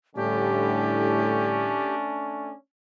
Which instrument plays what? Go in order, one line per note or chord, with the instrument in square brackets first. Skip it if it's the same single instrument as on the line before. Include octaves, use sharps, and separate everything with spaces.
[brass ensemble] A2 D3 G3 [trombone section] A3 C#4 D4 [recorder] G4